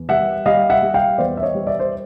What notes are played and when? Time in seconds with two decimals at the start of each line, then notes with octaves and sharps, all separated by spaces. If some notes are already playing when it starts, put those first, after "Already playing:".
Already playing: E2
0.09 G3 E5 F#5
0.46 G3 D#5 F5
0.70 E5 F#5
0.82 G3
0.94 F5 G5
1.18 E2 C5 D5
1.37 E5
1.43 C#5 D#5
1.55 G3
1.67 D5 E5
1.80 C5